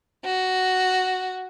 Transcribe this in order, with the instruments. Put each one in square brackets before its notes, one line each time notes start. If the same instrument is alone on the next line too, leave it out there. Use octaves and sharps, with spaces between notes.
[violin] F#4